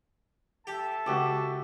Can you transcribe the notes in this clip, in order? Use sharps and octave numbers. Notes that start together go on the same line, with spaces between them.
G4 A4 E5 A5
C#2 F#4 G4 D6